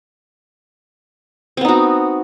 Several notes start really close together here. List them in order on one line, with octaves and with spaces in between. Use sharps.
C4 B3 D#4 F#4